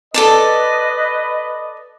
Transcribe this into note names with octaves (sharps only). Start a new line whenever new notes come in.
A4 B4 D5 D#5 A5